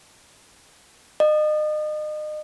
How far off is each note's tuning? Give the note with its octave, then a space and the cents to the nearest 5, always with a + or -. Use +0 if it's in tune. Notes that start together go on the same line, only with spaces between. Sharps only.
D#5 -35